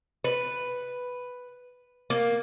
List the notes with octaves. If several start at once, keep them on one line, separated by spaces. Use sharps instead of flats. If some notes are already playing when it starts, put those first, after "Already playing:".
B4
A#3